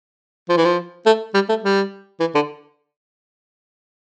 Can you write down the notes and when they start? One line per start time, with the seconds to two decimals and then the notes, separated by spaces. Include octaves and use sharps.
0.49 F3
0.57 E3
0.65 F3
1.06 A3
1.34 G3
1.49 A3
1.64 G3
2.20 E3
2.35 D3